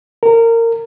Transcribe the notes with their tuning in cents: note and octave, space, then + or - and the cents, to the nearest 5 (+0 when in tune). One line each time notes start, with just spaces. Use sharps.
A#4 -20